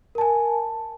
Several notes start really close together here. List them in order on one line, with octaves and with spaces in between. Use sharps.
A#4 A5 G#5